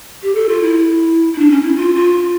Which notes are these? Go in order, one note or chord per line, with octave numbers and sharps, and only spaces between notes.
G4
A4
F4
E4
E4
D4
C#4
E4
F4
F4